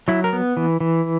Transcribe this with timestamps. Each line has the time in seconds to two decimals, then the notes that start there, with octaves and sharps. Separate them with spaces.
0.08 F#3 E4
0.24 A#4
0.33 B3
0.57 E3
0.80 E3